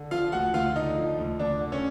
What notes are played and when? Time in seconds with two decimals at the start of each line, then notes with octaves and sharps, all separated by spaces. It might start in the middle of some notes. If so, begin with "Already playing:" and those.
Already playing: D3
0.11 F3 F4 F5
0.32 D2 F#4 F#5
0.54 D2 F4 F5
0.76 D3 D#4 D#5
0.97 F3
1.18 D2
1.39 D2 D4 D5
1.61 D3
1.72 C#4 C#5